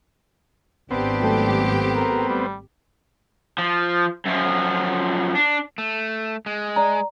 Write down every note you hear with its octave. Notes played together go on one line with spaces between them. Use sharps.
G#1 B3 C4 D4 G4
F#3 A3 A4
A#4
G3
F3
F#2 F3
D4
A3
G#3
D5 A#5